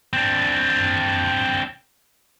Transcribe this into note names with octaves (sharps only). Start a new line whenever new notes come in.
C4 D4